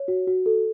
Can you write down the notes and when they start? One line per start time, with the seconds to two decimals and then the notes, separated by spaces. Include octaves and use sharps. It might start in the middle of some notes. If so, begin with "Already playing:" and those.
Already playing: C#5
0.08 F#4
0.27 F#4
0.46 A4